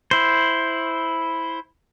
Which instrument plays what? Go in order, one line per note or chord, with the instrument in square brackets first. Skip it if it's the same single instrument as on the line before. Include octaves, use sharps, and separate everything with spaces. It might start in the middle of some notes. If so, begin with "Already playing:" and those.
[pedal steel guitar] E4 C5